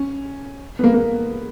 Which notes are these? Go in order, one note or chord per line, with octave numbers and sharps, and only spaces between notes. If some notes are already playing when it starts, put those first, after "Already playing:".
Already playing: C#4
B3
A#3
A#3